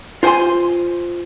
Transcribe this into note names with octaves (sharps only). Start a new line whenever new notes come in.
F4 C5 G5 G#5 C6